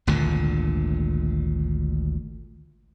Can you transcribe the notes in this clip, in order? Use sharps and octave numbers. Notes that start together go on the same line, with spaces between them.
G#1 D2 A#2 D3